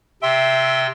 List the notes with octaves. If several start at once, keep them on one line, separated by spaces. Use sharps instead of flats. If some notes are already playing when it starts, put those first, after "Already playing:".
C3 E5 G5 C6